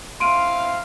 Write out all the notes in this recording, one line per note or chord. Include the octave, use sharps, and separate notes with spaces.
C4 E4 F5 C6 D7 D#7